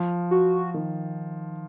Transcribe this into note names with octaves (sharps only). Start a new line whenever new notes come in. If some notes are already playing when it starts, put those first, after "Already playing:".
Already playing: F3
F#4
D#3